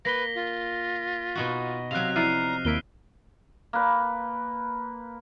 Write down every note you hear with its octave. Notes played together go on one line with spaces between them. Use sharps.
A#3 B4 A#6 B6 G7
F4
B2 D#4 F#4
C3 F#3 F5 F#6 F7
F3 E4 D5 A#5 F6 C7 D#7
D#2 A#3 E4 B6 D7 G7
A#3 B4